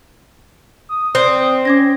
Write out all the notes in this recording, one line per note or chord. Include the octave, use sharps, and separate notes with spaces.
D#6
C4 C5 D5
C#4 D6 G#6 A#6